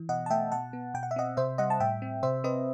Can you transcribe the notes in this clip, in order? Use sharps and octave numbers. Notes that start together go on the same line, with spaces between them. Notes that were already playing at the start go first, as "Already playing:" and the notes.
Already playing: E3
B2 D#5 F#5
A5
A3 E5 G5
B2 F#5 A5
B3
B2 G5
F#5
E5
C4 D#5 F#5
C3 C5 E5
G3 D#5 F#5
A5
A2 E5 G5
C4
C3 C5 E5
C4 B4 D#5